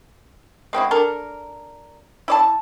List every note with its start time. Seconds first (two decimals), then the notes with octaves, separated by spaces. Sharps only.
0.73 G#3 C4 E4 F#4
0.91 D4 A4 A#4
2.28 E4 D5 A5